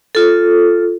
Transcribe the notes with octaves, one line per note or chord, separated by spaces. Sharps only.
F4 A4